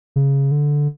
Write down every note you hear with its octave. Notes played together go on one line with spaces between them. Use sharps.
C#3
D3